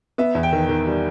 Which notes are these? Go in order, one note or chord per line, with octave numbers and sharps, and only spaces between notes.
B3 E5
E2
G5
D#3
D#3
G3